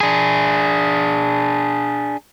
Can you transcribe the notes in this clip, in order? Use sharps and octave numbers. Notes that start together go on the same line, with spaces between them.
D4 G#4